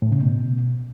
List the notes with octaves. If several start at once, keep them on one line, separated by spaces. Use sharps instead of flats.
A2
C#3
B2